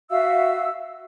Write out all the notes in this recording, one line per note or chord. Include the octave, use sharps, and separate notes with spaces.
F#4 E5 F5 E6